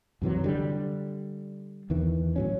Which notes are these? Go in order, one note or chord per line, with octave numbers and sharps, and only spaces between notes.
F#2 C3 E3 F#3
D3 G3
E2 D#3 E3
A2 F#3 C#4